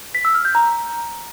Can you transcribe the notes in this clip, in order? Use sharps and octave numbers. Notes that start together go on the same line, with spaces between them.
B6
E6
F6
G6
A#5